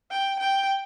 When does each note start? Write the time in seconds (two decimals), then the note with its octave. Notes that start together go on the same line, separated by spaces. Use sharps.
0.11 G5
0.40 G5